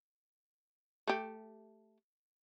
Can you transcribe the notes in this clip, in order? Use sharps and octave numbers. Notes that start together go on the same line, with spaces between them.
A3 G4